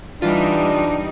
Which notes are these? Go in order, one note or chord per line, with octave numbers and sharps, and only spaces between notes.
E3 G3 D4 D#4 F4